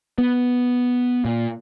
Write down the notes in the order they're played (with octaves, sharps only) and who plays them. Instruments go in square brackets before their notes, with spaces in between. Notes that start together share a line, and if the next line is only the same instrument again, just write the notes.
[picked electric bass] B3
A#2